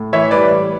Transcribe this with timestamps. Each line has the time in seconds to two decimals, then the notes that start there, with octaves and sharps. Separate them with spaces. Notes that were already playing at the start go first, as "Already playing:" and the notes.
Already playing: A2
0.13 E3 C#5 E5
0.31 G3 B4 D5
0.50 A2